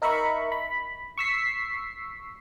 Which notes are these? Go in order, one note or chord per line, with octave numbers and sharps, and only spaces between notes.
D#4 A#4 E5 B5 C#6
B5
C#6 E6 B6 C7